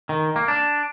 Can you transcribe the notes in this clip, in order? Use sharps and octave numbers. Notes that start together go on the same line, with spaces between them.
D#3
A#3
D4